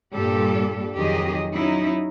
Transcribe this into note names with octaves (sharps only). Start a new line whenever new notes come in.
G2 A#2 G3 G4 A4
F2 D#3 F#3 G4 G#4 D#5
F#3 C#4 D#4 E4